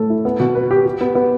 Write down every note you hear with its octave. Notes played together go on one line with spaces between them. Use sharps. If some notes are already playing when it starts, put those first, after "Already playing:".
Already playing: A2 A3 A4
E4
B3
B2
B4
G4
G4
B3
B3